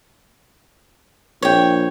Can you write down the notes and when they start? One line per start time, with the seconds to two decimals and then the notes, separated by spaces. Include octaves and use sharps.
1.42 A#1 C#5 G5